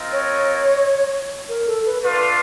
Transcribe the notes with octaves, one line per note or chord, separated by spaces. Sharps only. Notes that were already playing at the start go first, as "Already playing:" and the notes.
Already playing: C4 F4 A#4 D#5
C#5
A#4
A4
B4
A3 D4 F4 B4